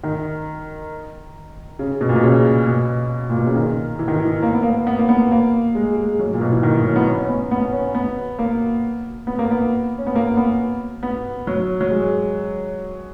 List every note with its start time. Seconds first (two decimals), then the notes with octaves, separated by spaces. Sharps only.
0.04 D#3
1.79 C#3
2.01 B2
2.09 A#2
2.16 B2
2.23 C#3
2.67 B2
3.30 A#2
3.38 B2
3.47 C#3
3.55 D#3
3.99 E3
4.08 D#3
4.16 E3
4.42 A#3
4.53 B3
4.63 A#3
4.87 B3
4.99 A#3
5.09 B3
5.31 A#3
5.75 G#3
5.96 G#3
6.19 F#3
6.34 A#2
6.41 B2
6.52 E3
6.63 D#3
6.74 E3
6.85 F#3
6.96 B3
7.07 C#4
7.18 C#4
7.29 B3
7.51 B3
7.72 C#4
7.95 B3
8.39 A#3
9.27 B3
9.39 A#3
9.51 B3
9.98 C#4
10.07 B3
10.15 A#3
10.37 B3
11.03 B3
11.47 F#3
11.81 F#3
11.90 G#3